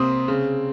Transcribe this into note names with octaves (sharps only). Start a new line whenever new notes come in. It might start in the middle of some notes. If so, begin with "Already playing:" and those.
Already playing: C3 A#3 C4 D#6
C#3